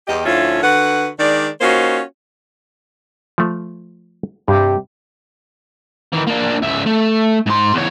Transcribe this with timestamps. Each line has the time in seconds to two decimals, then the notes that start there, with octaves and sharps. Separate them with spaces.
0.07 E2 G4 D#5
0.25 D2 F3 C#4 E4 F4
0.62 D3 F#4 B4 F#5
1.19 D#3 G#3 D4 D5
1.61 A#3 C#4 D#4 F4 F#4 C5
3.38 F3 A3
4.48 G2 C3 G3 G4
6.13 D#3 E3
6.27 A#3 D4
6.62 C#2 E5
6.86 A3
7.47 G#2 C6
7.74 E2 C#5